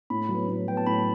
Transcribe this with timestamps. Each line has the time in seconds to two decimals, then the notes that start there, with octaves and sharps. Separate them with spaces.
0.10 A2 B5
0.29 F#3 B3
0.48 A2
0.67 F#3 B3 G5
0.77 A5
0.87 A2 B5